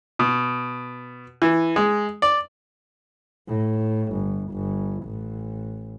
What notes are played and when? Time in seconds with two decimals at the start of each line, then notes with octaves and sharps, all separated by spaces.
0.19 B2
1.42 E3
1.76 G#3
2.22 D5
3.48 A2
4.13 G1
4.52 G1
5.04 A1